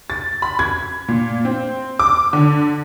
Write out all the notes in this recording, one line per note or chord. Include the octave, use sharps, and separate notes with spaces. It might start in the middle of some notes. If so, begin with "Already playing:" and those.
A6
B5
G#6
A#2
C4
D6
D3